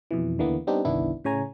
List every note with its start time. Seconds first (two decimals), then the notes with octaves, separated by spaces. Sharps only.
0.11 F2 B2 E3
0.39 D#2 D3 E3 A#3 B3
0.67 G3 B3 C4 D4 D#4 G4
0.85 G1 C2 D#3 B3 D4 E4
1.25 A2 C#3 C#5 G#5 A#5